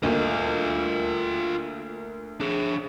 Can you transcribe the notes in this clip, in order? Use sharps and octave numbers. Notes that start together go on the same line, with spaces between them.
D2 A#3 F4 D#5
D4 G#4